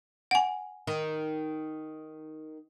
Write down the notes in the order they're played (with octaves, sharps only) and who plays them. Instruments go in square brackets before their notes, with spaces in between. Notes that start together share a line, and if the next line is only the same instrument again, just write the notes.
[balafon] F#5 G#5
[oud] D#3